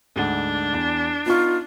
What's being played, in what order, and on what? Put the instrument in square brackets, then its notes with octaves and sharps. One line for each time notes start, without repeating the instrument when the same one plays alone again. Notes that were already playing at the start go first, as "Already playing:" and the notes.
[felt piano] D2 G#2 F#5 [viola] D4
[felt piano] E2
[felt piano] B3 D#4 C#6 [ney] F4